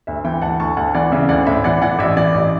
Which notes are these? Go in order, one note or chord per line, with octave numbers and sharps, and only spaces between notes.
D2 E5
E3 E5 G5
D2 F#5 A5
D2 A5 C#6
D2 F#5 A5
E3 D5 F#5
C#3 E5
D2 D5 F#5
A2 E5
E3 D5 F#5
E3 D5 F#5
A1 E5
E3 D5
A1